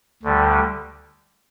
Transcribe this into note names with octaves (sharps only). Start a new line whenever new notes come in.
D2 D3 G3